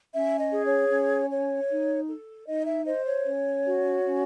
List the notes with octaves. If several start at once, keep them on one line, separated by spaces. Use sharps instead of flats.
C#4 E5
D#5
G#4
C#5
C#4
C#5
D#4
A4
D#4 D#5
E5
C5 D#5
C#5
C#4
F#4
C#4